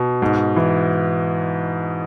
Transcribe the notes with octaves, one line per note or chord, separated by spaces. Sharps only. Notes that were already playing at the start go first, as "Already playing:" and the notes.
Already playing: B2
G#2
E3